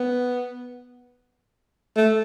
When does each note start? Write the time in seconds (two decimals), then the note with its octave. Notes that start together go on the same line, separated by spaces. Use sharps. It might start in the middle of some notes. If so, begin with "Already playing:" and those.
Already playing: B3
1.97 A3